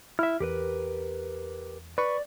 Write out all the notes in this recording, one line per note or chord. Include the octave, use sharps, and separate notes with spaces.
E4 E5 F6
E2 G4 A#4 B4
B4 D5 B5 C#6